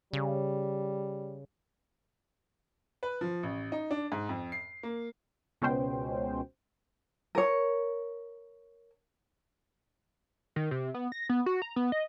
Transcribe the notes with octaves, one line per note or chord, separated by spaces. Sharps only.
C#3 G3
B4
F3
A1
D#4
D4
G#2
F2
C7
A#3
C#2 B2 C#4 C5 G5
A#4 C#5
D#3
C3
B3
A#6
B3
F#4
A#5
B3
D#5